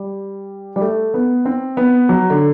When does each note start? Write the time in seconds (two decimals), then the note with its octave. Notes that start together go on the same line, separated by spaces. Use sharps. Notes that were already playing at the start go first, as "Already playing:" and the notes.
Already playing: G3
0.76 G3
0.81 A3
1.14 B3
1.45 C4
1.77 B3
2.09 F#3
2.30 D3